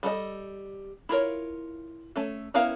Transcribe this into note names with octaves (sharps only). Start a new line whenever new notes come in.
G3 A4 A#4 D#5
E4 F4 A#4 C#5
A3 C#4 A4
B3 C#4 E4 A#4 F5